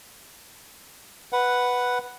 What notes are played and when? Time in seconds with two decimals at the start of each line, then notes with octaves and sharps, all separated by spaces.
1.33 B4 F#5